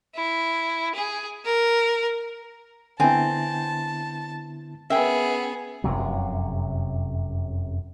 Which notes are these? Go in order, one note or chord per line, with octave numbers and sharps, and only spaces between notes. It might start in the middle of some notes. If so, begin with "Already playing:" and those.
E4
G#4
A#4
D3 B3 C4 E4 G#5 A5
B3 C#4 G#4 A#4 E5 G5
F1 F#2 C3 F#3